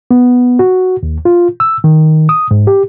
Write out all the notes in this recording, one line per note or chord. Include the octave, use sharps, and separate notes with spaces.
B3
F#4
D#2
F4
E6
D#3
D#6
G#2
G4